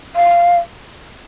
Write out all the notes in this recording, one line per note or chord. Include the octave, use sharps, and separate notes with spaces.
F5